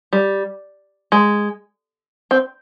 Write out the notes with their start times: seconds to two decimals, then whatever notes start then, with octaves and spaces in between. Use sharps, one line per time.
0.13 G3
1.12 G#3
2.31 C4